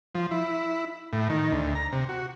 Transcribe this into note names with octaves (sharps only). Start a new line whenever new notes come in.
F3
E4
A2
D#3
D2
A#5
C3
F#4